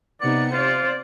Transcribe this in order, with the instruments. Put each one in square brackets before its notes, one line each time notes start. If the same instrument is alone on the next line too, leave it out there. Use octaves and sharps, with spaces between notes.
[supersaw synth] C3 C#7 [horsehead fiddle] B3 D#4 [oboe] D5
[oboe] F4 [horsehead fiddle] C5 D5